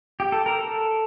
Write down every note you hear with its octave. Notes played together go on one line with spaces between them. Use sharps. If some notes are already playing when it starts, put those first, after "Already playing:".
G4
A4
A#4
A4